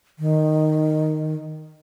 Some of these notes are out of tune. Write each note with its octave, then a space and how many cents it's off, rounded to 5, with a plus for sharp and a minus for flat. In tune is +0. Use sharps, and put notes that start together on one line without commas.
D#3 -5